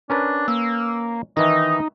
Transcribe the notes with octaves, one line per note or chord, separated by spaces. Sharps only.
C#4 D4 A#4 B4
A#3 E6
D#3 E3 D#4 E4 D#5